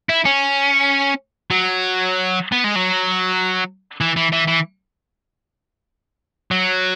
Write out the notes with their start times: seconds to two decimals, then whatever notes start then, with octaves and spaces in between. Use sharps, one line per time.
0.09 E4
0.25 C#4
1.51 F#3
2.52 B3
2.64 G#3
2.76 F#3
4.01 E3
4.16 E3
4.32 E3
4.48 E3
6.51 F#3